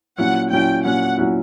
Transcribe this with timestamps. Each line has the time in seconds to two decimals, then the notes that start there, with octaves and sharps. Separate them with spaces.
0.18 A#2 F#3 C#4 E4 F#5
0.51 A#2 F#3 C#4 E4 G5
0.85 A#2 F#3 C#4 E4 F#5
1.17 A#2 F#3 C#4 E4